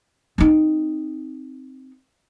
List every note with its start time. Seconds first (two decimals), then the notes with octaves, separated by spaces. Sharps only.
0.38 C4 D#4